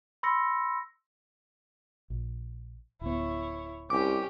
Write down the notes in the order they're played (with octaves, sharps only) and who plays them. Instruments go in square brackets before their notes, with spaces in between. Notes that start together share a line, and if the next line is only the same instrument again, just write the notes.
[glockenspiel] B5 C6 E6 A#6 C#7
[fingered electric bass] A#1
[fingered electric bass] D1 B3 [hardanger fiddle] E4 C#5
[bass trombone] C2 [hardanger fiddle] C#4 G4 [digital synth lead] D6